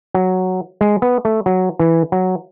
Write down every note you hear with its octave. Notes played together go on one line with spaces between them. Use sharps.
F#3
G#3
B3
A3
F#3
E3
F#3